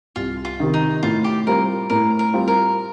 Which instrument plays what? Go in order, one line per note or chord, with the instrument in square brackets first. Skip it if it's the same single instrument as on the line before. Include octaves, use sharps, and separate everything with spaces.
[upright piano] C2 [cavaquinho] F4
[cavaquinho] F4
[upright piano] C3 D#3
[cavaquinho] D#4
[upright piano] A2 [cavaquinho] F4
[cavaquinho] G4
[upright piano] G3 C4 F4 [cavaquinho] A#4
[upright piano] A2 [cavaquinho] A#4
[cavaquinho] A#4
[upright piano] G3 C4 F4
[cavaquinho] A#4